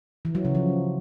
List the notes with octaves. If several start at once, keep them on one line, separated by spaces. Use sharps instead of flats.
E3
F#3
C#3
F3